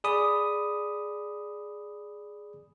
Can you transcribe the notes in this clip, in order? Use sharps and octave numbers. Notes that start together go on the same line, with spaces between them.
G#4 D5 B5 D#6